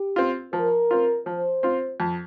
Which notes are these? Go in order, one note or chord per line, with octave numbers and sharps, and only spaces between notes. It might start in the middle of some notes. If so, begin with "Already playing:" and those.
Already playing: G4
C4 F4
F3 A#4
C4 F4
F3 C5
C4 F4
F2